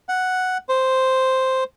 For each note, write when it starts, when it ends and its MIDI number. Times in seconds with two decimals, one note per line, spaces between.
0.09 0.58 78
0.69 1.64 72